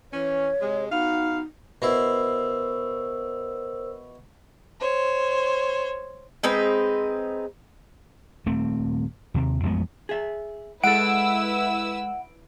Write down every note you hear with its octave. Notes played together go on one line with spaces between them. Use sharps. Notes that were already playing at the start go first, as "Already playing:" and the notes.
E3 C#4 C#5
C3 G#3
B3 D#4 F#4 F5
B2 E4 A#4 C5 E6
C5 C#5
G#3 C4 D#4 B4
D#1 A3 C4
D#2 C3
A1 F2 G#3 B3
G#4 E5
G#3 E4 A4 B4 F#5 E6 D7